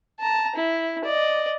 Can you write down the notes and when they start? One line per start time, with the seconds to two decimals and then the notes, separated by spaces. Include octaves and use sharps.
0.20 A5 A#5
0.56 E4
1.05 D5 D#5